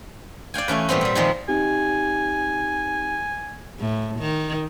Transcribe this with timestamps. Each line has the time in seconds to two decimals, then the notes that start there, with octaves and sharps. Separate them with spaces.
0.54 D5 F5 G5 G#5
0.68 E3 A3 C#4 B4
0.89 A#2 G3 B3 C4
1.01 A#2 G3
1.15 A#2 D#3 F3 G3 G#3
1.48 C4 D#4 G4 G#5
3.79 A2
4.20 D#3